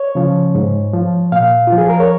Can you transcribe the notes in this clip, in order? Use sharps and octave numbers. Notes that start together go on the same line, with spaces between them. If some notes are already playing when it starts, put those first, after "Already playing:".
Already playing: C#5
C#3 F3
G#2
F3
A#2 F5
F3 F4
G#4
A#4
C#5